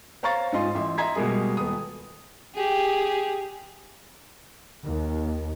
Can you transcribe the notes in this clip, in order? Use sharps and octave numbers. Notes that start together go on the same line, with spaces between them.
C5 C#5 F5 A#5 C#6 A6
G#2 C#4 F4 D#5 C6
A1 E5 C6
D#5 E5 A#5 C6 G#6 B6
B2 G3 G#3 A#3 G#4
D#1 B3 D#6
G4 G#4
D#2